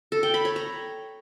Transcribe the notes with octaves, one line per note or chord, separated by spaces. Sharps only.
A4
G5
B5
C#5
A#5